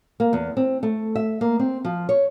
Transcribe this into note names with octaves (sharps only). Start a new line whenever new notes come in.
A#3
E2
C4
A3
E5
A#3
C4
F3
C#5